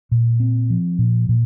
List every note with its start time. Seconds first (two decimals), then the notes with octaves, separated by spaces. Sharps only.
0.12 A#2
0.40 C4
0.70 F3
0.99 A#2
1.29 A#2